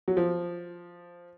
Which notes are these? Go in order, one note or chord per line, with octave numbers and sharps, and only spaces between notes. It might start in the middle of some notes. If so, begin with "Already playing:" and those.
F#3
F3